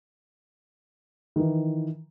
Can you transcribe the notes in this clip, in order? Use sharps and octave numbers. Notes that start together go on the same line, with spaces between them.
D#3 E3